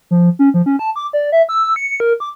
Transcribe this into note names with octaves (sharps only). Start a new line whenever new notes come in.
F3
C#4
F3
C#4
A5
D6
D5
E5
E6
C#7
A#4
D6